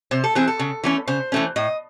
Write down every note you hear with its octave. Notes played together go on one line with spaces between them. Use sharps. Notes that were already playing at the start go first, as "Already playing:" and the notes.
C3 C5
A4
E3 C4 G#4
A4
C#3
E3 A3 C#4
C#3 C5
E3 A3 C#4
A2 D#5